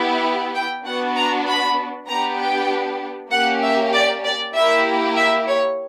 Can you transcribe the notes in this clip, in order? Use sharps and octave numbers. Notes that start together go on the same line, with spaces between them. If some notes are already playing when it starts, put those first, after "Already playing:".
Already playing: B3 E4 G4
G5
B3 D4 F#4 F#5
A#5
B5
B3 D4 G4 A#5
G5
A#3 C#4 G4 F#5
E5
D5
D5
A#3 E4 G4 E5
E5
C#5